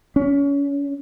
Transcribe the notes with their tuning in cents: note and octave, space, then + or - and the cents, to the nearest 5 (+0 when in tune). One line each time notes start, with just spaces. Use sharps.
C#4 +30